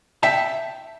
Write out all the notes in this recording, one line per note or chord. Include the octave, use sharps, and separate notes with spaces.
E5 G5 A5